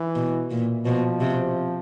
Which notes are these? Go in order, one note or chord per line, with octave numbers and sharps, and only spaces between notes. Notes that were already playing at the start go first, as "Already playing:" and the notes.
Already playing: E3
B2
A#2
B2 F3
C3